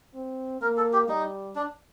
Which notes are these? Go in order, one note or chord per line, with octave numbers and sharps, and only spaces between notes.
C4
A#3 A#4
A4
G4
G3 D#4
D4